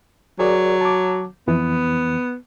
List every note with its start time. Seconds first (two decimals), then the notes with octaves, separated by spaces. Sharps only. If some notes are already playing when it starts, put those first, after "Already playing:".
0.39 F#3 G#4 A#4 D5
0.81 A5 D6
1.48 F2 E3 B3